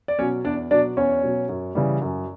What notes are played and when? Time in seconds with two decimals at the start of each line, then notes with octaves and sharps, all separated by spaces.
0.08 D5
0.19 B2 F#3 C#4 C#5
0.45 E2 D4 D5
0.71 B2 F#3 D4 D5
0.97 E2 C#4 C#5
1.23 B2 F#3
1.49 F#2
1.75 C#3 E3 G3
2.02 F#2